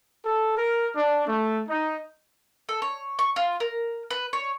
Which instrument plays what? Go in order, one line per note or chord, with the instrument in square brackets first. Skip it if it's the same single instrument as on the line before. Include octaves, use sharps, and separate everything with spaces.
[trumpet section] A4
A#4
D4
A3
D#4
[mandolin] A4
C#5
C#6
F4
A#4
B4
C#5